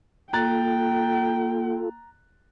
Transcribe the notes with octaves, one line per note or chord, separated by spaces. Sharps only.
A#3 F4 A4 G5 A#5 F#6 A6